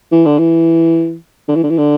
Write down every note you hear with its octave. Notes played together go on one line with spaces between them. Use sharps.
E3
D3
E3
D3
E3
D3
E3
D3